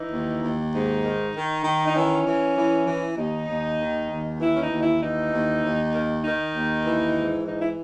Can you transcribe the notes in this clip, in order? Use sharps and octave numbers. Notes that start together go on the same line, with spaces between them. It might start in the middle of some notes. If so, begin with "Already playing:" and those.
Already playing: E3 D#4
D#2
D#2
G#2 D#4
D#3
D#3
D#3
D#4
E3 C#4
E3
E3
E3
D#2 D#4
D#2
D#3
D#2
E3 E4
C#4
D#4
D#2
E4
E3 D#4
D#2
D#2
D#3
D#3 D#4
D#2
E3
G#2
E3 D#4
E4